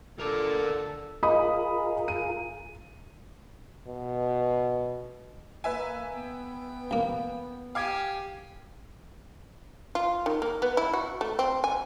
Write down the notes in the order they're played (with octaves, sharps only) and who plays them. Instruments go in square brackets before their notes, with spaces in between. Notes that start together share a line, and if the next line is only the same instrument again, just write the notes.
[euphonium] D3 [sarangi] A4 [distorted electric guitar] A#4 D5
[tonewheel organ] F4 G#4 A#4 [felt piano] D#5 B5 D#6
[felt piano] D#7
[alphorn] B2
[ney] A#3 [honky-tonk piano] B4 E5 G#5
[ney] B3 [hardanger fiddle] G5
[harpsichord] A1 A#3
[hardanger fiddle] G4 G#5 [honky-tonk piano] F5 D6 G#6
[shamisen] F4
D#3
A#3
B3
E4
F#4
A3
C4
G#5